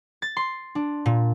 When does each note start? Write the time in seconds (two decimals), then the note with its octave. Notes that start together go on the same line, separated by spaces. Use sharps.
0.22 A6
0.37 C6
0.75 D4
1.06 A#2